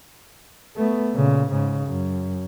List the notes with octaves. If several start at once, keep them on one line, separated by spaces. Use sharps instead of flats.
A3 B3
A#2 C#3
G#2 C#3
F#2